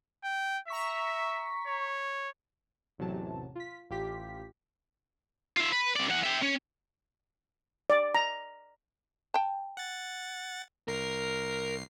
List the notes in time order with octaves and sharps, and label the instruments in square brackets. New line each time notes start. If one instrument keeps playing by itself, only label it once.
[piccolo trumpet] G5
[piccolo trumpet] E5 [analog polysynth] A#5 C#6 B6
[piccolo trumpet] C#5
[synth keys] A1 E2 C3 F#3 A5
F4 B6
A1 F4 G4 B6
[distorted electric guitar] F4 E5
B4
C3 D5
E3 F#5
E5 G5
C#4
[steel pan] D5
A#5
[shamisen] G5 A5
[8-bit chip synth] F#5 A6
[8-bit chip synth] C2 C7 [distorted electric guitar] A#4